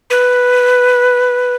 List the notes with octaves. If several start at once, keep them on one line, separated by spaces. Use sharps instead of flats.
B4